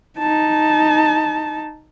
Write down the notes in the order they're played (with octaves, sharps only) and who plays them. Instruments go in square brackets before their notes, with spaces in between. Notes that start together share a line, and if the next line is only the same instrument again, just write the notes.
[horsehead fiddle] D#4 A5